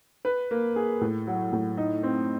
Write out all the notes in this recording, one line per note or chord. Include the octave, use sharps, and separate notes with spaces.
B4
A#3
G#4
A2
F#3
A2
D#4
C4